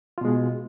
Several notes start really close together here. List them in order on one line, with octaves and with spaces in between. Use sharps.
F4 B2 G#3